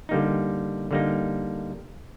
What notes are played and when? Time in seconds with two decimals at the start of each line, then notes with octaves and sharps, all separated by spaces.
0.09 D3 G3 A#3 D#4
0.91 D3 G3 A#3 D#4